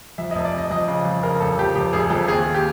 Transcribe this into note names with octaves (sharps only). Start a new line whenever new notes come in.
F2 E5
F1 D#5
D5
F1 D#5
F2 D#5
C#3
F2
C#3 A#4
F1 A4
F2 G4
F1 G4
F1 G#4
F2 A4
D#2 G#4
D#2
G4